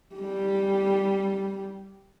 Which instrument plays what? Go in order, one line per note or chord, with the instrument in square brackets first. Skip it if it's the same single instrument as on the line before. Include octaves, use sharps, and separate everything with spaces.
[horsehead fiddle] G3 G4